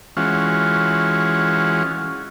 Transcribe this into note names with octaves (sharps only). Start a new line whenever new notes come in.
E3 G#3 C#4 F4 F#4